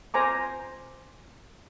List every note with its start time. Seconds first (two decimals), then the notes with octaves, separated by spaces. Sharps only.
0.14 C5 G#5 A#5 D6